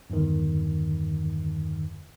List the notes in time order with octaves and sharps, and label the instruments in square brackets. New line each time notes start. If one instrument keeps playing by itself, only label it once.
[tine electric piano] E2 G2 D3 D#3